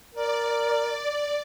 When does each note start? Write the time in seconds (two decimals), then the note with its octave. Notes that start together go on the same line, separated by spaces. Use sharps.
0.15 A#4 D5